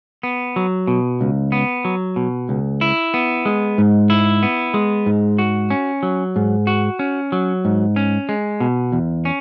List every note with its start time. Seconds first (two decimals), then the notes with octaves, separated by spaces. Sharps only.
0.23 B3
0.56 F#3
0.87 B2
1.21 C#2
1.52 B3
1.85 F#3
2.16 B2
2.49 C#2
2.81 E4
3.14 B3
3.46 G#3
3.78 G#2
4.10 E4
4.43 B3
4.74 G#3
5.06 G#2
5.39 F#4
5.70 C#4
6.03 F#3
6.36 G#2
6.67 F#4
6.99 C#4
7.32 F#3
7.65 G#2
7.96 C#4
8.29 G#3
8.60 B2
8.92 E2
9.25 C#4